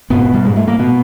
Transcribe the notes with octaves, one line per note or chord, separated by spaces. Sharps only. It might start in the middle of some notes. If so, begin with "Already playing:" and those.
G#2 B2 B3
G3
G#2 G#3
A3
A#3
B2 B3